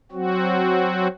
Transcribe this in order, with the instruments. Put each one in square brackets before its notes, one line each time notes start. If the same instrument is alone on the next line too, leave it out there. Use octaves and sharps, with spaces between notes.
[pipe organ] F#3 C4 F#4